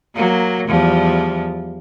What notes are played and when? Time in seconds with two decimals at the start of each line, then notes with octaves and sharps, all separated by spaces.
0.15 F#3 A#3
0.67 E2 F3 G3